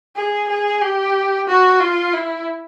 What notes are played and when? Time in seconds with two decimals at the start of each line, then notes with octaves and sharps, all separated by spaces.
0.16 G#4
0.49 G#4
0.82 G4
1.48 F#4
1.80 F4
2.13 E4